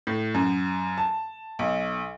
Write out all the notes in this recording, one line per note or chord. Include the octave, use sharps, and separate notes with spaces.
A2
F#2
A5
B1